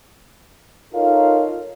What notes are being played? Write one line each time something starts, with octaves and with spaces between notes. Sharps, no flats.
D#4 F4 A4 A#4 C#5 F5